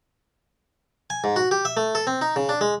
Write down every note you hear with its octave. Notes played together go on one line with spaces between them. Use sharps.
G#5
G#2
F#4
G4
E5
A3
A4
C4
D#4
C#3
D4
G#3